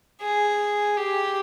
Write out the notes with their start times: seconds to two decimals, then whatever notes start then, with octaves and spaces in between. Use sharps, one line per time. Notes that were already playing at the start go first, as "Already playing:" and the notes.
0.21 G#4
0.97 G4